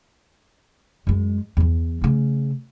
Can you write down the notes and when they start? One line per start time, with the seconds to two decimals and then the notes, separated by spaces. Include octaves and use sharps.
1.07 F#2 G#3
1.57 E2 E3
2.01 C#3 A3